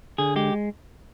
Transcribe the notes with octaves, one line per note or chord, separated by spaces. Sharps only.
D3 G#4
G#3 G4